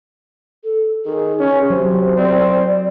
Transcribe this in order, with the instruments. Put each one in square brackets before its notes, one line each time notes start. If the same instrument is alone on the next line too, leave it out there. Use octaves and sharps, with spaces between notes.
[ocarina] A4
[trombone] D#3 [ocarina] G#4
[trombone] C#4 [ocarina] G#4
[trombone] C3 [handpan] F#3 [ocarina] C5
[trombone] C4 [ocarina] D5